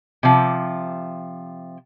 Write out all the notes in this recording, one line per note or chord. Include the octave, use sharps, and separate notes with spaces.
C3 F3